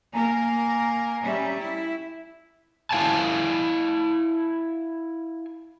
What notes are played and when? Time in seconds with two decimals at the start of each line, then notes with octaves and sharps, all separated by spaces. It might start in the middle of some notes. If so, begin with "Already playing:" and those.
0.14 A#3 A#4 G#5 A#5
1.23 G3 C#4 E5
1.59 E4
2.91 E4 F5 G#5 A5